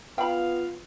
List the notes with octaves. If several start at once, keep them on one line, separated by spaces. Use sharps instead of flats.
B3 F4 F5 G5 B5